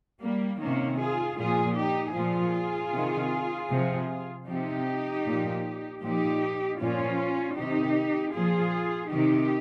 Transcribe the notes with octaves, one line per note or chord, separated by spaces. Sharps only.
G3 A#3
C3 D#3 A#3 C#4
F4 G#4
A#2 F3 F4 G#4
D#4 G4
A#2 F3 F4 G#4
C3 D#3
C3 F3
C3 F3 D#4 G4
A#2 F3
A#2 F3 D#4 G4
A#2 F3 C#4 F4
C3 D#3 D#4 G4
A#2 F3 F4 G#4
C3 D#3 D#4 G4